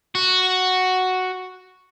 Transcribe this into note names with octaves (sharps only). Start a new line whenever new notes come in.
F#4